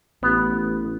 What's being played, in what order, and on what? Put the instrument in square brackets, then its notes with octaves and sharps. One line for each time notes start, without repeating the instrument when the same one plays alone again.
[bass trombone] A1 [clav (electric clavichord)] B3